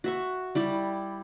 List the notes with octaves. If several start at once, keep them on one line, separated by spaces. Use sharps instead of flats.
F#4 E5 C#6
G3 E4 G4